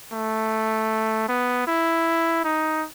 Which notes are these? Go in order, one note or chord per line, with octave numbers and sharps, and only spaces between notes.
A3
B3
E4
D#4